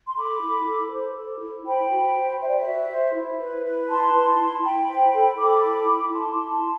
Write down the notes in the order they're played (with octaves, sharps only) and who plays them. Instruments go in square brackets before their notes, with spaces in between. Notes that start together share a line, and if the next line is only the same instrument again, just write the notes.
[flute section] C6
A4 B5 D6
E4
A4
C5
A4
E4
C5 G5 B5
F#4
C5
C5 E5
D5
E5
F#4
C5
E4
B4
B4
E4 A5 C6
E4
E4
E4 G5 B5
C5
A4
A4 B5 D6
E4
E4
E4 A5 C6
E4
E4